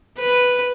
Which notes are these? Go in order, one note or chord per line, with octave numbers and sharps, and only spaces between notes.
B4